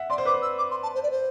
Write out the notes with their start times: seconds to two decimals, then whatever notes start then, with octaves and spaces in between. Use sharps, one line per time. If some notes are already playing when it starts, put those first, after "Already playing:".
Already playing: E5 F#5
0.10 D5 C6
0.18 C5
0.25 B4 D6
0.34 C5
0.42 E6
0.58 D6
0.70 C6
0.83 A5
0.94 C5
1.03 D5
1.11 C5